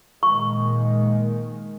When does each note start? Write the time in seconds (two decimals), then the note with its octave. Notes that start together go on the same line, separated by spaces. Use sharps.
0.23 A#2 D#3 G#3 C#6